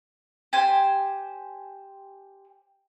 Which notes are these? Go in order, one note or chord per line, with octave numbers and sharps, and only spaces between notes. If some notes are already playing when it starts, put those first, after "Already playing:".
G4 C5 G#5